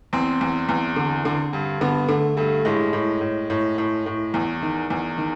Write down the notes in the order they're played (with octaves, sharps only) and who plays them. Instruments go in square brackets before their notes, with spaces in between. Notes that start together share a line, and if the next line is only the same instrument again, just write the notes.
[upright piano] E2 C4
E2
E2
D3
D3
G2
D3 B3
D3 A3
G2 A3
A2 G#3
A2
A2
A2
A2
A2
E2
D#3
E2
D#3